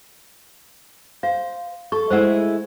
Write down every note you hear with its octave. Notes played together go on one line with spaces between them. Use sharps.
C5 F5
A4 C#6
G#3 A3 E4 C5 F#5